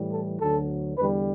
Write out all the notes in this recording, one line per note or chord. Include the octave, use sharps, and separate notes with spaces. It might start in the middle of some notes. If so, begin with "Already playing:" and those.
Already playing: A2 E3 G3
A4
D2 D3 F#3 A4
E2 D3 G3 B4